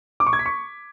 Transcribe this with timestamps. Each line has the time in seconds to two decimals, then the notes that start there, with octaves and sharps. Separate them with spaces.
0.20 D6
0.27 C#6
0.33 G#6
0.39 B6
0.46 C#6